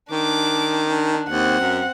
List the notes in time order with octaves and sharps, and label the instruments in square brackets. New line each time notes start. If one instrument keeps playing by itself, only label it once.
[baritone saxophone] D#3 [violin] D4 D6
[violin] D4
[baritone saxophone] D#2 [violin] C4 F#5
[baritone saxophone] F#2